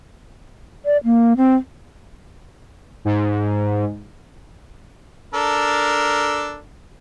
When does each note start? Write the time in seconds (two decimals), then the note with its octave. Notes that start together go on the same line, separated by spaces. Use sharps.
0.85 D5
1.04 A#3
1.37 C4
3.05 G#2
5.34 D4 A4 A#4